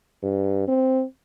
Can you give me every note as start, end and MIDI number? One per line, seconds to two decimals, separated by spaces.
0.23 0.64 43
0.68 1.04 60